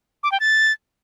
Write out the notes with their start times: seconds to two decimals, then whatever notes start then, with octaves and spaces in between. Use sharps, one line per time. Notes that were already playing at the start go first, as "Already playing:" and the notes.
0.23 D6
0.32 G5
0.40 A6